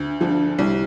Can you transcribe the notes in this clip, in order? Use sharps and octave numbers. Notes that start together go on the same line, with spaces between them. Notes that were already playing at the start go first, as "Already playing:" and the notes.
Already playing: D2
D3 F3
C2